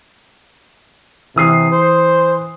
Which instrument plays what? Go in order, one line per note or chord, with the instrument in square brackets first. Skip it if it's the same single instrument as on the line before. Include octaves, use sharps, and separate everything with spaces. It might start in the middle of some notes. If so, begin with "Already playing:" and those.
[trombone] C3 [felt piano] E3 D#6 C7
[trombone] C5